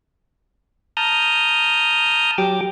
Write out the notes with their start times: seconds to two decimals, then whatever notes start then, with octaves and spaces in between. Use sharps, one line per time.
0.97 A5 A#5 D#6 F6 G6
2.38 F#3 G4 G5 D6